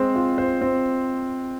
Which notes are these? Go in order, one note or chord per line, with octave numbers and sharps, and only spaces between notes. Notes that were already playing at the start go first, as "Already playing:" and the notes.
Already playing: G#3 C4 C5
F4
C5
C4